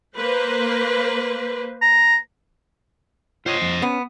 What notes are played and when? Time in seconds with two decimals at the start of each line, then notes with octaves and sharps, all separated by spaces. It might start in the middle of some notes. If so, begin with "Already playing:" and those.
0.15 A#3 B4 C5
1.81 A#5
3.46 F4 C5 C#5 D#5
3.62 F2
3.82 B3 C#4